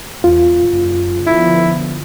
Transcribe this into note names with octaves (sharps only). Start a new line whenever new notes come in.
E2 F4
F#1
D3 F3 B3 E4